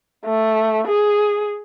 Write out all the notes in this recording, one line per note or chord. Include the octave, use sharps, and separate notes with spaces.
A3
G#4